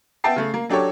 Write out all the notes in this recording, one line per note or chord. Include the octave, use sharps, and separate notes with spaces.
B3 E5 G5 A5 C7
C#3 A3
A#3
F#3 D4 G4 A4 C#5